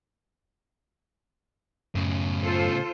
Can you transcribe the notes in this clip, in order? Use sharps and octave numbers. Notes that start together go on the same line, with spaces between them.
F#2 A2 C#3
F4 A4 C5